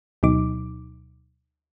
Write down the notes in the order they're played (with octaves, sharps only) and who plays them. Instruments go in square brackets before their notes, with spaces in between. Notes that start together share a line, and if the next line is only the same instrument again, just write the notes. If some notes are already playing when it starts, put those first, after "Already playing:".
[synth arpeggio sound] D2 B2 F#3 D#4 D6